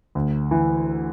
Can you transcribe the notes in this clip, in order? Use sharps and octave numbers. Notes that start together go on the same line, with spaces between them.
D2
E3